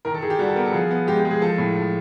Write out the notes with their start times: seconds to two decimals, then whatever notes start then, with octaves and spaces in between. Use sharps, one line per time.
0.05 D#3 A#4
0.14 A4
0.22 D#3 G#4
0.30 G4
0.39 G3 F#4
0.48 A4
0.56 B3 A#4
0.66 A4
0.73 F3 G#4
0.91 B3
1.07 G#3 G4
1.20 G4
1.25 G#3
1.31 G#4
1.41 F3 A4
1.58 A2
1.76 F3